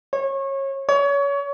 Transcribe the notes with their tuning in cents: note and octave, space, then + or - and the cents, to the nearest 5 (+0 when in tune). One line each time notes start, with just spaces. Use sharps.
C#5 -25
C#5 +30